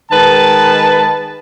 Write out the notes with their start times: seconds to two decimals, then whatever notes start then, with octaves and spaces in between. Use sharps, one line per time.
0.11 D#3 G#3 B4 A5